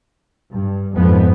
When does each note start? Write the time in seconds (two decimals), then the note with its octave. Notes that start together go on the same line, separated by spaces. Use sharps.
0.50 G2
0.95 F2 G#2 F3 B3